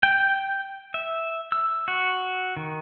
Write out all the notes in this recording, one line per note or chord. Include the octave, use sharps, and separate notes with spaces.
G5
E5
E6
F#4
D#3